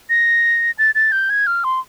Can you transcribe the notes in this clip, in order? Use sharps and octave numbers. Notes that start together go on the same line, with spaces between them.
A#6
A6
A6
G6
G#6
F6
C6